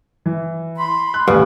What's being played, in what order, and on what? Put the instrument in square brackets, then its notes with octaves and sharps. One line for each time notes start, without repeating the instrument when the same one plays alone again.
[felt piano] E3
[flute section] B5 C6
[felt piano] F#6
[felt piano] D#1 A1 G#5 [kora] G2